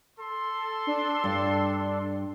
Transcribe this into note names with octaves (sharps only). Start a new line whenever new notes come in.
A4 C6
D4
G2